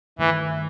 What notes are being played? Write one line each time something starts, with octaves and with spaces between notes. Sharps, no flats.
G2 D#3 E3 A3